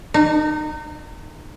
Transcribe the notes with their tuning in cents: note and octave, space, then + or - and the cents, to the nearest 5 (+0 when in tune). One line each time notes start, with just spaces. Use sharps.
D#4 -30